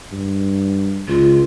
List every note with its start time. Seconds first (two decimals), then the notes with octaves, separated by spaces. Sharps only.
0.12 G2
1.08 C#2 F4